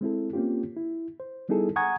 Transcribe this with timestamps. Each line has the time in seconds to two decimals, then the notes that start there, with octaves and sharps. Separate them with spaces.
0.01 G#3 C4 E4 A4
0.33 A#3 C4 C#4 F4 G4
0.77 E4
1.20 C5
1.49 G3 B3 D#4 E4 G#4 A4
1.76 F#5 G#5 A#5 C#6 D#6 G#6